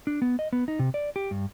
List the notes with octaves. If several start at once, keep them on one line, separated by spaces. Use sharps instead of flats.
D4
B3
D#5
B3
D#4
C3
D5
G4
G2